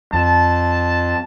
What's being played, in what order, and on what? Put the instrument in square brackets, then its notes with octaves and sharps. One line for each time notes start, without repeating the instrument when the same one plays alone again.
[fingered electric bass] F2 [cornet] A5